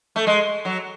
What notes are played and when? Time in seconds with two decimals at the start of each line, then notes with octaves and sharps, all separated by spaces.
0.16 A3
0.27 G#3
0.65 F#3